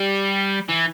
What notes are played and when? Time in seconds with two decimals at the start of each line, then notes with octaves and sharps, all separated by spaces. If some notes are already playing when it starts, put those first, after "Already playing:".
Already playing: G3
0.69 E3